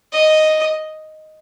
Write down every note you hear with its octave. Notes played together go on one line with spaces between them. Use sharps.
D#5